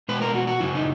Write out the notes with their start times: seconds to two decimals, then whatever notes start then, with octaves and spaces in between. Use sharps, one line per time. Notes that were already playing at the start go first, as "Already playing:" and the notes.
0.09 B2 G#3 B3 B4
0.22 A#4
0.35 F#4
0.47 F#4
0.60 F#2 C#3 F#3 E4
0.75 D#4